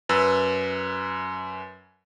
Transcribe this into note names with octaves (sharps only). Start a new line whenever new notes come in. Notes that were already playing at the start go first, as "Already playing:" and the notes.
F#2 B4 E6